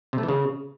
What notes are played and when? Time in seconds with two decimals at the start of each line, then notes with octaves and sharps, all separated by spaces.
0.13 C3
0.18 A3
0.23 E3
0.28 C#3